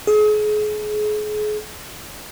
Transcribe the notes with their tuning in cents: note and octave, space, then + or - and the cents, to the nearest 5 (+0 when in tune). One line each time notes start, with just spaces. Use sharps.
G#4 +35